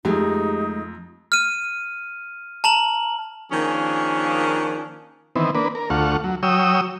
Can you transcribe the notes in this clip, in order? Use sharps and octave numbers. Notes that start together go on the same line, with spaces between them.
F2 G#3 A3 D#4 G4 G#4
F6 D#7
A5 A#5 F#7
D#3 F3 A#3 C#4 D4 G#4
D#3 E3 B3 C4
A#3 D4 B4
A#4
D2 A3 F4 F#5 C#6
F#3
F#3 C#5 G5 D#6 E6